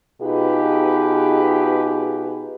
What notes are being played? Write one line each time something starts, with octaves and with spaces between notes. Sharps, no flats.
B2 D#4 F4 G4 G#4 B4